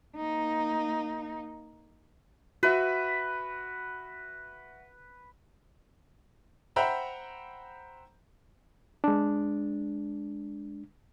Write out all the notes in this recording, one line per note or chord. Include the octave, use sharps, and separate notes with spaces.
A#3 D#4
F#4 B4 E5
C5 E5 F#5 G5 A#5 B5
G#3 D4